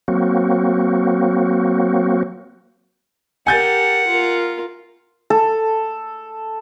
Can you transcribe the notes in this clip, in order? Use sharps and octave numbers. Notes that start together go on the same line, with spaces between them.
F#3 A#3 C4 F#4
G4 A#4 F#5 G#5 G6 A6
F4 A#4
A4